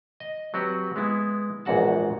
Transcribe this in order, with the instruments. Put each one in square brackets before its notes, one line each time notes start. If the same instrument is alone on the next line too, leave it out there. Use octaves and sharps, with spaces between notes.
[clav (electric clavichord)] D#5
F#3 C4 F#4 G4 B4
G#3 B3 E4
A#1 E2 G#2 F#4 F#5 A5